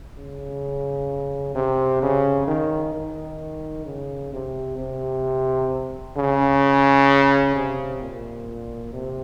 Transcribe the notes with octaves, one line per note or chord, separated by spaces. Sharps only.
C#3
C3
C#3
D#3
D#3
C#3
C3
C3
C#3
C3
A#2
C3